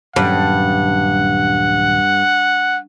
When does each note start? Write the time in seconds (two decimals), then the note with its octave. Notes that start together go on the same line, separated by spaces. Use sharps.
0.16 D#1 G2 F#3 C#4 F#5